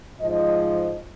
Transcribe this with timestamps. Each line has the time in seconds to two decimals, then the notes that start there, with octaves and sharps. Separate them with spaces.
0.21 G#2 F3 C5 D#5